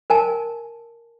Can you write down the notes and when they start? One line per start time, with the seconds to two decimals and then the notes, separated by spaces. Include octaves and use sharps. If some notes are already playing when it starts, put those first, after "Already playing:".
0.10 A#4 G#5 A5